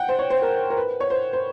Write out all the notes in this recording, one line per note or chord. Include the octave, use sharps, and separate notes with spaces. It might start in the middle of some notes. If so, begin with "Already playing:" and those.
Already playing: F#5 G5
C5
C#5
C5
A#4
A#4
B4
C#5
C5
C5